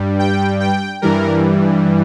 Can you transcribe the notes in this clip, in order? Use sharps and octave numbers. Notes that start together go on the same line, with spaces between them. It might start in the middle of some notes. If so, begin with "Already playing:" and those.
Already playing: G2 G3
G5
G5
G2 E3 G3 A#4